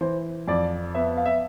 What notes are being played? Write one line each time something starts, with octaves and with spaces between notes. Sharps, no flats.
E3 C5
F2 D5
B3 E5
F5
E5